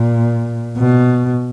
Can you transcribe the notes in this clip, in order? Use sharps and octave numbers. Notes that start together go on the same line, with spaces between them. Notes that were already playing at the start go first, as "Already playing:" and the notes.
Already playing: A#2
B2